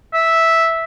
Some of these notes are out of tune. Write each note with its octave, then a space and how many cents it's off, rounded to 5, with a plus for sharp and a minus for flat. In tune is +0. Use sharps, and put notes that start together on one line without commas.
E5 -5